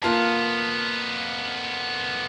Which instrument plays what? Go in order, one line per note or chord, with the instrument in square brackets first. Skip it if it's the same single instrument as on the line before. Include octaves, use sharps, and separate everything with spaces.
[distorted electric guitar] F2 B3 [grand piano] A#3 F4 A5